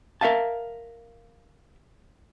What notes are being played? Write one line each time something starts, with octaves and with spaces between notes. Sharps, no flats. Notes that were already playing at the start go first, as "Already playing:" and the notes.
A#4 E5 F5 A5